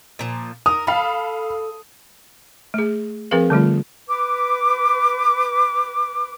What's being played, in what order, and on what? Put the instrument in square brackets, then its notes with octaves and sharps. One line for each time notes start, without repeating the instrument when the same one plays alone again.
[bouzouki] A#2 F3
[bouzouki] A#4 [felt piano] D#6
[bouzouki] A4 [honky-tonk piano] F5 B5
[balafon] A3 G#4
F3 C4 G#4 A#4 B4 F5
D3 G3 A3 F4
[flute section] B4 D6